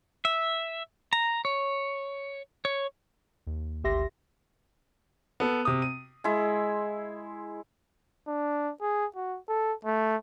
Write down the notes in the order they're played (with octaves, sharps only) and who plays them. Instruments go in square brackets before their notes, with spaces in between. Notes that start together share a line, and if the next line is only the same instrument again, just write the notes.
[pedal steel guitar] E5
A#5
C#5
C#5
[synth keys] D#2
G#1 D2 G4 E5 C6 A#6
[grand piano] B3 A4
C3 D#6
D#7
[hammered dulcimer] G#3 E4 E5
[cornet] D4
G#4
F#4
A4
A3